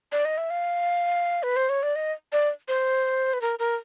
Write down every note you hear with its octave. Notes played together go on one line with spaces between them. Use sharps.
D5
D#5
E5
F5
B4
C5
C#5
D5
D#5
D5
C5
B4
A#4
A#4